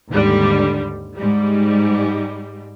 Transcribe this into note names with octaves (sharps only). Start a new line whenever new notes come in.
D#2 G#2 D3 G3
G#2 G3